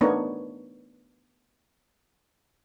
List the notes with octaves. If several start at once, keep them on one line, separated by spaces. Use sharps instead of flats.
A3 B3 D4 D#4 A#4 C#5